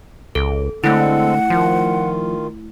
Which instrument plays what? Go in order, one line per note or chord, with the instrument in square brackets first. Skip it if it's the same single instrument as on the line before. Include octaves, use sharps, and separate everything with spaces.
[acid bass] C#2 [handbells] A4
[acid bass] D3 [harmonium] G#3 C4 A4 [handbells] A3 E4 [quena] F#5
[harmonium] D#3 F4 [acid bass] F3